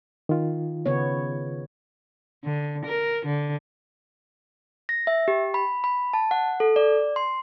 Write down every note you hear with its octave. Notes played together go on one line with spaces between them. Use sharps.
D#3 F4
C#3 B3 C#5
D3
A#4
D3
A#6
E5
G4
B5
B5
A5
F#5
A4
D5
C6